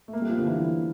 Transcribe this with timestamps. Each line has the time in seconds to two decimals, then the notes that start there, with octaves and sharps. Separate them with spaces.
0.08 A3
0.13 A#3
0.22 G3
0.29 F3
0.38 D3
0.46 E3